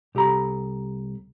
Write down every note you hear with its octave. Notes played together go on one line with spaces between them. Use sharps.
C2 G4 A4 A#5 B5